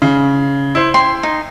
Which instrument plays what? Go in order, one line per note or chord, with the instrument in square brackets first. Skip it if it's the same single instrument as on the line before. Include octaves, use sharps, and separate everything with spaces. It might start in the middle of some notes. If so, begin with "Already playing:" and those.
[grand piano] C#3
E4 C5
[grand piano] G5 [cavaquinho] C6
[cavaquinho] D#4